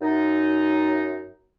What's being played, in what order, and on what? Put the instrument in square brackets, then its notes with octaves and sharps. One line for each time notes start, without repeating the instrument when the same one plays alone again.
[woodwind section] F#2 D#4